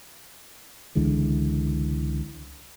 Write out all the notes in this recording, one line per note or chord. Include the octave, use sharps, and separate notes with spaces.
C#2 D3 E3 G#3